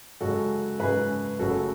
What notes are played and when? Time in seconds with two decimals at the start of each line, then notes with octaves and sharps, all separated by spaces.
0.21 F#2 C#3 G#3 F#4 A4
0.80 F#2 C#3 G#3 G#4 B4
1.39 F#1 F#2 C#3 F#3 A3 F#4 A4